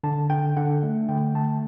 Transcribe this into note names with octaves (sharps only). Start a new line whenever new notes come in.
D3 A5
D3 G5
D3 F#5
A3
D3 G5
A3 A5